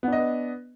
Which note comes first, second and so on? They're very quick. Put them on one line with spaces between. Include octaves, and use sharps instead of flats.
B3 D4 D#5 B4